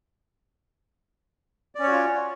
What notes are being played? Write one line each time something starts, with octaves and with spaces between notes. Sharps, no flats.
C#4 F4 F#4 C#5 D5